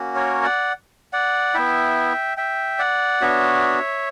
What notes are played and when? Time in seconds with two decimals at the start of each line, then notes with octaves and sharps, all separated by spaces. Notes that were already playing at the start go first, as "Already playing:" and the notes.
Already playing: A#3 C#4 F#4
0.16 A#4 C#5
0.43 D5 F#5
1.13 D5 F#5
1.54 B3 E4 E5 G5
2.37 E5 G5
2.79 D5 F#5
3.21 B3 D4 F#4 C#5 E5